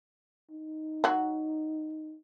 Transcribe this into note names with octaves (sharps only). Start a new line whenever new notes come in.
D#4
F#3 F#4